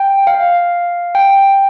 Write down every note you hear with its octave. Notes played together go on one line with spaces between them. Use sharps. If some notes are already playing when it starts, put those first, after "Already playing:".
Already playing: G5
F5
G5